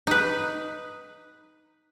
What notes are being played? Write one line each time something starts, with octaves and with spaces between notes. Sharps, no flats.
D#4 B4